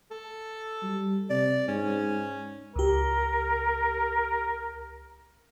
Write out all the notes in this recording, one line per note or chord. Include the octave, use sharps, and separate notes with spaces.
A4
G3
C3 D5
G#2 C#4
C#2 G4 A#4